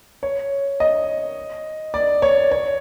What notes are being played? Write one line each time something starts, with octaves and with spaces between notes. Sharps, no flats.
C#5
D#5
D5
C#5
C#5